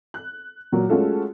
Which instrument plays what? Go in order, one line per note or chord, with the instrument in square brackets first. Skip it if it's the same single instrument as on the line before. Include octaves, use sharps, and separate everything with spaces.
[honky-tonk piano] F#6
A#2 F#3
G#3 A3 C#4 F4 F#4 A4